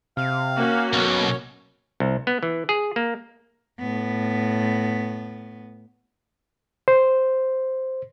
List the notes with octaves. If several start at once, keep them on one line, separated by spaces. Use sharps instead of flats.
C3 F5
A#3 C#4 F#4
B1 B2 C#5
C2
B3
E3
G#4
A#3
A2 B3
C5